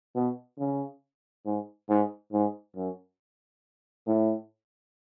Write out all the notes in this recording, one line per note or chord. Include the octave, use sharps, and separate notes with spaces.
B2
C#3
G#2
G#2
G#2
F#2
A2